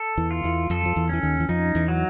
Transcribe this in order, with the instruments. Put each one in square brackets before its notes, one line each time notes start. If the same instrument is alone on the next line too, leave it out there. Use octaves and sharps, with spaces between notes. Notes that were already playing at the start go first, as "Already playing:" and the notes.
Already playing: [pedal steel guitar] A4
[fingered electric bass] E2 E3
[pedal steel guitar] F4
[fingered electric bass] E2 E3
[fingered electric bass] F2 F3 [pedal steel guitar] A4
[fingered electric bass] F3
E2 E3
[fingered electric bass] E3 [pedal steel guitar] C#4
[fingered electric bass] D#2 D#3
E3
[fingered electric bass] F2 F3 [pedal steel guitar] D#4
[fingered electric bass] E2 E3
[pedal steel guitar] F#3